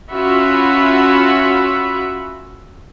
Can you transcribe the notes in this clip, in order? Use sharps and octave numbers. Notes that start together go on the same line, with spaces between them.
C#4 F4 F#4 E5 B5